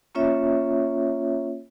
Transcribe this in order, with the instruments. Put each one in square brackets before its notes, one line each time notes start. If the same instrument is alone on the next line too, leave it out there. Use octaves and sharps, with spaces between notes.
[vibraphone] A#3 C#4 F4 C#5 E5